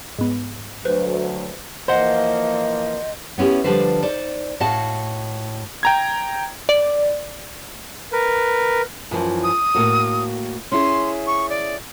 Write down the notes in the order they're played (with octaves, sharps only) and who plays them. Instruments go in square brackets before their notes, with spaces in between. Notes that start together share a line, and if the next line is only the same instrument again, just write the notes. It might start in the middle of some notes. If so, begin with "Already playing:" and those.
[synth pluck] G#2 B3
[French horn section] D2 F#3 [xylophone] B4 C5
[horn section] E3 F3 A#3 [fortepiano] C5 F#5 [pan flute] D#5
[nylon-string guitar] B3 C#4 E4 G4
D3 F3 G3 D4 B4 C5
D#4 C5 D5
A2 F#4 D#5 F5 A5
[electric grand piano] G5 A#5 G#6
[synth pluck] D5
[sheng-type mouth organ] A#4 B4
[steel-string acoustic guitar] F#2 E3 F3
[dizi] D#6
[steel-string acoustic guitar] A2 A#3 F#4
[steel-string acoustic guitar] C#4 E4 G#4 [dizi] C6
[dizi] C#6
D5